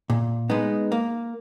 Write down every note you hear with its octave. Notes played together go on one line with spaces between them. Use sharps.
A#2
G#3 B3 D#4
A#3